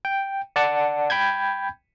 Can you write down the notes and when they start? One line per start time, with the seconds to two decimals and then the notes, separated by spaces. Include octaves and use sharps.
0.05 G5
0.56 D5 F#5 A5
1.10 G5 B5 G6 G#6